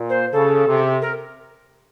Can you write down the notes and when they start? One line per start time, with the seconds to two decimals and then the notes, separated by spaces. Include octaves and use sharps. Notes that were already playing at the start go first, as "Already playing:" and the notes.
Already playing: A#2
0.09 C5
0.32 C#3 A4
0.67 C3
1.02 A#4